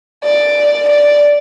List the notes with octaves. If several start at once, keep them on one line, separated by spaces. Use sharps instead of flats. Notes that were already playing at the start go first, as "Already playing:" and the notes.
D5
D5